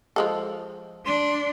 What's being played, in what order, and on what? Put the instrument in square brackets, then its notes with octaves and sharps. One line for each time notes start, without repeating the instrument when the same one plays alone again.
[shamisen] F3 G#3 A4
[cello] D4 [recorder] C6